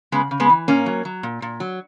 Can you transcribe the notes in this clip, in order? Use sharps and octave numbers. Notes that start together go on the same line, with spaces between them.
C#3 G#3 B3
C#3
G#3 B3
E3
A#2 A#3 C#4
F#3
F#3
A#2
A#2
F#3